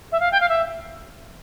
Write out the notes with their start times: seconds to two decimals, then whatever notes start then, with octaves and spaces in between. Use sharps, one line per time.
0.12 E5
0.20 F5
0.32 G5
0.40 F5
0.49 E5